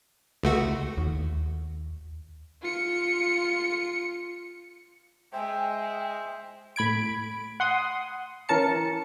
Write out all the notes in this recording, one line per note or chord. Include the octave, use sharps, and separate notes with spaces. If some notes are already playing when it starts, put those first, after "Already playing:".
C#2 A3 F#4
D#2
F4 C#7
G#3 C5 E5 G5
A2 B5 G#6 D7
F#5 C6 D#6
E3 C#4 A#4 A5 C#7